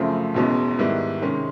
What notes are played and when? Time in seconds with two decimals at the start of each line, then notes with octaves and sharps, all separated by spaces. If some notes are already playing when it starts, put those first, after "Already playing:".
Already playing: F#2 C#3 F3 A3 C4
0.34 E1 E2 B2 G#3 C#4
0.79 G#2 D#3 G3 B3 E4
1.22 C3 D#3 G#3 C#4